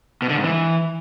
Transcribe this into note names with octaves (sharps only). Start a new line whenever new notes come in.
B2
D3
G#2
E3